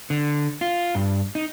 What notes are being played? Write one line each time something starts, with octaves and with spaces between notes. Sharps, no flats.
D3
F4
G2
D#4